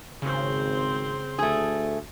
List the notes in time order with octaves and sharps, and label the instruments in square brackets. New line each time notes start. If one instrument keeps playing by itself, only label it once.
[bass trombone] G#1 [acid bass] C#3 [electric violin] C4 C5
[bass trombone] D2 [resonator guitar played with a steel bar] A3 G#4